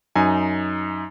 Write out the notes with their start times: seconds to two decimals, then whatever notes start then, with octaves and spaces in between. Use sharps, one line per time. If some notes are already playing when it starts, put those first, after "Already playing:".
0.16 F#2 D#4 G#5